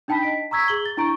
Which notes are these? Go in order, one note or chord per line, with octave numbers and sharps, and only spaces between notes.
D4 D#4 G5 A5 B5 B6
D#5 B6 D7
A#5 C#6 E6 G#6 B6
G#4 F#7 G7
A6
D4 E4 A#5 C#6 D7